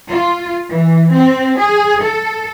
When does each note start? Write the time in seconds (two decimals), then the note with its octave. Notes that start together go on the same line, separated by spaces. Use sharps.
0.10 F4
0.69 E3
1.13 C4
1.59 G#4
2.01 A4